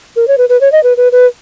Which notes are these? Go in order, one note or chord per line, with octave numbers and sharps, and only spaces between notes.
A#4
C#5
B4
B4
C#5
D#5
B4
B4
B4